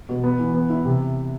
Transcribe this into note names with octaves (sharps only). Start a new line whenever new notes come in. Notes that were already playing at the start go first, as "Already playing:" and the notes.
B2
B3
E3
B3
E4
C3